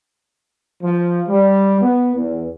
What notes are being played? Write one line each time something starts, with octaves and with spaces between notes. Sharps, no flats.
F3
G3
B3
E2